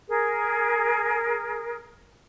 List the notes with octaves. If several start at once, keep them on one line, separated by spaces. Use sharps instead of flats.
G#4 A#4